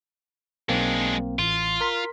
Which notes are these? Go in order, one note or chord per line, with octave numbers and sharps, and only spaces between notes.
B1 G#3 A#3 C4 D4
A1 F4
A#4 C6 B6